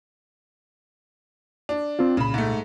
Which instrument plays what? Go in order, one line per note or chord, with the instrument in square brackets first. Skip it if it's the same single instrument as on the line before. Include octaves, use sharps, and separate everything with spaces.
[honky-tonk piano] D4
[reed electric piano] C4 F4
[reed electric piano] C2 A#2 [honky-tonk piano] C#3 B5
[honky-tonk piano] G#2 A3